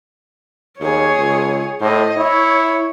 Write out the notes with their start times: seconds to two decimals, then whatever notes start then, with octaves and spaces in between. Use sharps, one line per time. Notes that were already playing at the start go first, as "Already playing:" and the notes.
0.80 D#2 G#4 C#5
1.18 C#2
1.81 A2 C5 D#5
2.17 E4 C#5